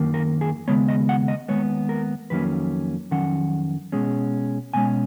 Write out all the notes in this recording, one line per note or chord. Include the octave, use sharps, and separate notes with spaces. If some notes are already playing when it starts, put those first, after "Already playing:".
Already playing: F#2 D#3 A#3
A#4
G#4
D#2 C#3 G#3 B3 C#5
D#5
F#5
D#5
D#2 C#3 G#3 B3 C#5
A#4
F2 D#3 F#3 A#3 C#4 B4
F2 D#3 F#3 C#4 F#5
B2 G#3 C#4
B2 G#3 C#4 G#5